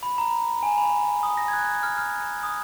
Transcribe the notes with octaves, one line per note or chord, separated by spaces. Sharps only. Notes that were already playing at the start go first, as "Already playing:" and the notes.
B5
A#5
G#5
B5
D#6
A#6
G#6
F#6
F6
F6
D#6